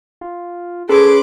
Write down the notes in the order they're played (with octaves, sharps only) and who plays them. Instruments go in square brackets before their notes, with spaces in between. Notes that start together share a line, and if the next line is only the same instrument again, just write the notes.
[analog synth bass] F4
[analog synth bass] C#4 [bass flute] G#4 [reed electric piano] A4 A5 G#6 [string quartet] B4 C6 D6